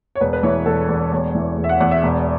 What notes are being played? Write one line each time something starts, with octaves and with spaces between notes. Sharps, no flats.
C#5
E1 B4
B4
E3 C#5
E1 A4
E2
E1 C#5
E3
E1
E5
F#5
E2 F#5
E5
E1